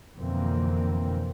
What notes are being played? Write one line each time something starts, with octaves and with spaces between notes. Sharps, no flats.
F2 B2 D3 E3 A#3 C4